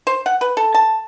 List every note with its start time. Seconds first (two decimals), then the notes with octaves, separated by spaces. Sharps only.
0.07 C5
0.26 F#5
0.41 B4
0.57 A4
0.74 A5